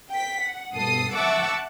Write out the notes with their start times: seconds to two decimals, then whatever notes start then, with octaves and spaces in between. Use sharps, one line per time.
0.12 G5 B6
0.43 F#5
0.76 G2 B2 A4 D#6 C7
1.14 E5 F#5 A5 C#6 D6 E6